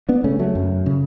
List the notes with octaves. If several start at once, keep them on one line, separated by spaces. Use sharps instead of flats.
B3 D4
C#3 A3 C#4
F#3 A3
F#2
C#3